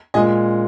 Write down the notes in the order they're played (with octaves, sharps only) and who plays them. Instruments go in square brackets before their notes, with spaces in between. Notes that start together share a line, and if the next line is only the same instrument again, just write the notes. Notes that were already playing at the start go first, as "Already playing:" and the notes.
[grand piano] A#2 G#3 D#5 G#5